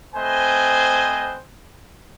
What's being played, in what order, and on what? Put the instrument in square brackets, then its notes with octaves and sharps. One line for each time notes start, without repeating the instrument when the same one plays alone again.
[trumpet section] A3 C4 B4 C5 D#5 G#5